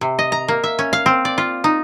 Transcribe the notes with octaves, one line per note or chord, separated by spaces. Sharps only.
C3
D#5
A#5
A#3
E5
C#4
F5
C4
D5
F4
D#4